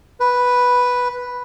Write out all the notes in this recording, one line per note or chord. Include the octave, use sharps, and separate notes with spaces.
B4